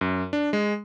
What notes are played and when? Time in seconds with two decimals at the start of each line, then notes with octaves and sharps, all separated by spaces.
0.01 F#2
0.33 D4
0.53 G#3